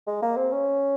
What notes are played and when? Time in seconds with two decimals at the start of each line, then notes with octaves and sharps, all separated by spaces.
0.07 G#3
0.22 A#3
0.36 C4
0.52 C#4